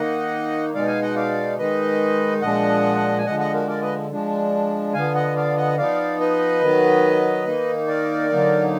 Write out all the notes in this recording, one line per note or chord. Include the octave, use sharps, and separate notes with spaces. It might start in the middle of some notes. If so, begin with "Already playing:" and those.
Already playing: D#3 A#3 D#4 D#5 F#5
B2 G#3 D#4 D5 F5
F5 G#5
D#5 F#5
D5 F5
D#3 G#3 D#4 B4 D#5
A#2 F3 G#3 D4 D#5 F#5
G#5
D3 F3 G#3 D#5 F#5
D#5 F#5
F#4 A#4
A#4 D5
B4 D#5
F3 G#3 D4
D3 F3 B3 F5 G#5
D#5 F#5
D5 F5
D#5 F#5
F3 B3 D#4 D5 F5
B4 D#5
D#3 F#3 B3
D#3 A#3 D#4
A#4 D5
D3 F#3 A#3 D#4